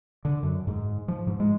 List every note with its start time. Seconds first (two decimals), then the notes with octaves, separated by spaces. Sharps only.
0.25 D3
0.43 F#2
0.67 G#2
1.08 F3
1.27 G#2
1.40 G#3